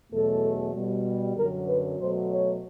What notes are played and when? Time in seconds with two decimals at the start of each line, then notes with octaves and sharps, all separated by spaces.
0.11 E2 B2 F#3 A3 A4
0.75 B2 G3
1.36 F#2 D3 F#3 A#4
1.67 B4
1.99 B2 F#3 A3 C5
2.30 C#5